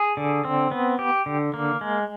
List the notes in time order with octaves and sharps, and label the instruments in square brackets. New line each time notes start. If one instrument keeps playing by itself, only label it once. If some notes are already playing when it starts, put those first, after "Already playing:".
Already playing: [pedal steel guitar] G#4
D3
C4
B3
G4
D3
A#3
G#3